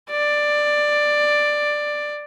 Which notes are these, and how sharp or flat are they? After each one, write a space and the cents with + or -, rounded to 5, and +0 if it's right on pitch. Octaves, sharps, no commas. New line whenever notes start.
D5 +10